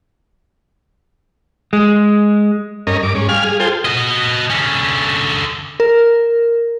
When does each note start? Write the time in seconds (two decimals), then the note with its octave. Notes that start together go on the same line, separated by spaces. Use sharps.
1.73 G#3
2.87 G2 C#4 A#4 D#5
3.03 G2 D6
3.15 G#2 C#4
3.29 G3 F5 G#5 F6
3.44 G#4
3.60 F4 G#4 A4 C5 G5
3.85 F#4 D#5
4.50 D3 C#4
5.80 A#4